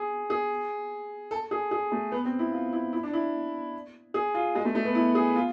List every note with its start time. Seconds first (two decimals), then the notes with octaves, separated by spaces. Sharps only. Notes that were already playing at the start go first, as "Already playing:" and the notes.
Already playing: G#4
0.30 G#4
1.31 A4
1.51 G#4
1.71 G#4
1.92 A3
2.12 B3
2.25 C4
2.39 E4
2.52 F4
2.73 E4
2.93 E4
3.03 D4
3.13 E4
4.14 G#4
4.34 F4
4.55 G#3
4.65 A3
4.75 A3
4.85 B3
4.95 E4
5.15 G#4
5.36 F4